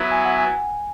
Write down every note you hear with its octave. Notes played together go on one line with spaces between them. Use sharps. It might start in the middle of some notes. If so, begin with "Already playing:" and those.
Already playing: F#3 B3 E4
G#5
F#5
G#5